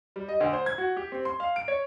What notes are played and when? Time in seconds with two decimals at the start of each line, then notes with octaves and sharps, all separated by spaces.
0.16 G3
0.29 D#5
0.41 D2
0.53 C5
0.66 G#6
0.78 F#4
0.97 G4
1.12 C4
1.25 C6
1.40 F5
1.56 D7
1.68 C#5